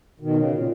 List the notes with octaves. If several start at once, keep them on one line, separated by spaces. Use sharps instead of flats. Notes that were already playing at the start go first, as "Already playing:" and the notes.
B2 D#3
C#3
A#2